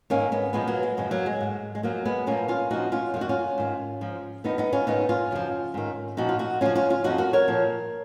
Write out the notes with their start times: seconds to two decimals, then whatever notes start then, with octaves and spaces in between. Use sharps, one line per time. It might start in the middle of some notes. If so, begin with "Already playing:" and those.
0.10 G#2 D#3 A#3 C#4
0.32 G#3 B3
0.53 A#2 F3 G#3 B3
0.67 F#3 A#3
0.83 G#3
0.97 F#2 C#3 F3 G#3
1.11 F#3 A#3
1.26 G#3
1.40 G#2 D#3
1.75 G#3
1.83 F#2 F3 F#3 A#3
2.05 G#3 B3
2.27 A#2 F3 A#3 C#4
2.48 C#4 F4
2.70 A#2 F3 D#4 F#4
2.92 C#4 F4
3.14 F#2 D#3 F4
3.21 F#4
3.29 C#4 F4
3.58 G#2 D#3
4.01 G#2 F3
4.44 F2 D#3 B3 D#4
4.58 B3 D#4
4.73 C#4 F4
4.87 G#2 D#3 B3 D#4
5.09 C#4 F4
5.31 F#2 C#3 F3
5.74 G#2 D#3
6.17 A#2 F3 D#4 F#4
6.29 F4
6.39 D#4 F#4
6.61 F#2 C#3 F3 C#4 F4
6.75 C#4 F4
6.90 C#4 F4
7.04 F2 F3 D#4 F#4
7.18 F#4 A#4
7.33 A#4 C#5
7.48 A#2 F3